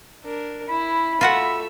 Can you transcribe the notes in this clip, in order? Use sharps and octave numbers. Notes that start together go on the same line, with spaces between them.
D4 A#4
E4 B5
A3 F4 F#4 E5 F#5